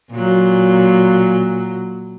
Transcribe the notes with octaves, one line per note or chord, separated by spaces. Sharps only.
A#2 F#3